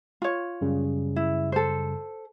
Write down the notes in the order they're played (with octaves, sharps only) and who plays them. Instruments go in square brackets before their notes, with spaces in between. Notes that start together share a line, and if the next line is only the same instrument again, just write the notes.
[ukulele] F4 C#5
[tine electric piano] F#2 C#3 G3
[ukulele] E4
A4 C5